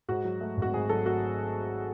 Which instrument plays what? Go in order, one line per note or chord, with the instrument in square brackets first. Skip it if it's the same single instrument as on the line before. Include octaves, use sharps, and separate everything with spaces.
[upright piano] G#2 F#4
F#3
A3
G#1
F#4
G#2 G#4
F#3 A4
A3 F#4